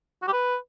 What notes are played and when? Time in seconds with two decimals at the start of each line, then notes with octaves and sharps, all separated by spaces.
0.22 F#4
0.27 G4
0.33 B4